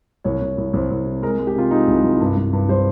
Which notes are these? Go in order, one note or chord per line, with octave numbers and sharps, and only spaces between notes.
C2 C#5
C2
C2
C2 C5
C2
C3
G#3 A#4
G#3
G4
C3 F4
G#3 D#4
C2
C2
G2
G2
G2
G3 C5